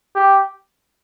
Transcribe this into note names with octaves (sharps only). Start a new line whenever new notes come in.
G4